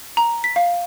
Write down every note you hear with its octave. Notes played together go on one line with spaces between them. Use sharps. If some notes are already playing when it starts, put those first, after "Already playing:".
A#5
B6
F5